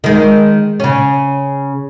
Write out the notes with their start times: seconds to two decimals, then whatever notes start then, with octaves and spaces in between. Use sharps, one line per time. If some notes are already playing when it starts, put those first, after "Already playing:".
0.04 D#3 G#3
0.80 C#3 C#4